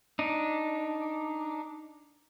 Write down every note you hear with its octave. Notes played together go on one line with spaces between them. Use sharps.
D4 D#4